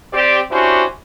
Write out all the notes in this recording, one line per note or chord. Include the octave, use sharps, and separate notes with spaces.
C4 G4 D5
C#4 D4 E4 F#4 G4 C5